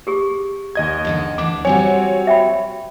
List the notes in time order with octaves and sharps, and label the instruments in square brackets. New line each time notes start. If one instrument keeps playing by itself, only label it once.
[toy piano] G4 G#4 C#6
[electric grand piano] D#2 D#5 G#6
[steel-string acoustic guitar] E2 D3 A4
[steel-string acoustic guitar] D2 E3 D4 [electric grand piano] D6
[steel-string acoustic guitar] F#3 G3 F#4 [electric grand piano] C4 C#5 [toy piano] G#5
[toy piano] E5 G5 B5